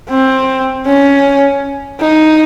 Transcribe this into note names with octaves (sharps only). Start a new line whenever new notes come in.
C4
C#4
D#4